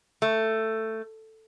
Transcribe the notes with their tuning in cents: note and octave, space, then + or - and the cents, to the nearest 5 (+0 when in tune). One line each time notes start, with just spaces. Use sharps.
A3 +10